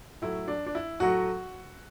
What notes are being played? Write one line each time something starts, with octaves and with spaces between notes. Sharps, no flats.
A2 F#3 A3 E4
D4
D4
E4
A2 F#3 A3 F#4